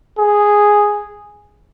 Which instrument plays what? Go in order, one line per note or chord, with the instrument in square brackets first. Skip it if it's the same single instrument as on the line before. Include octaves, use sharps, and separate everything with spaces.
[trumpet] G#4